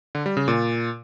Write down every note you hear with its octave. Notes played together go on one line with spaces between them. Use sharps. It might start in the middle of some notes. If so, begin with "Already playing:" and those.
D3
G3
C#3
A#2